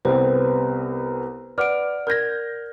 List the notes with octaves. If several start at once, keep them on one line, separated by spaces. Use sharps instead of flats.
C2 B3 C4 B4 C5
B4 D5 F#5 D6 F6 D7
A#4 F6 G6 G#6 A#6